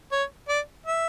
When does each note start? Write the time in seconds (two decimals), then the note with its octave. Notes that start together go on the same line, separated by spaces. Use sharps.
0.12 C#5
0.48 D5
0.86 E5